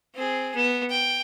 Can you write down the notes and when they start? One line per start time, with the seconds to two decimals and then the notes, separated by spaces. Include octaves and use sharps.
0.15 C4 G#4
0.55 B3
0.90 G5